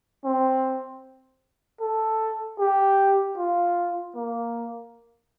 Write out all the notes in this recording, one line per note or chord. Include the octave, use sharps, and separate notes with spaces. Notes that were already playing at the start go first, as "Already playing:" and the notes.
C4
A4
G4
F4
A#3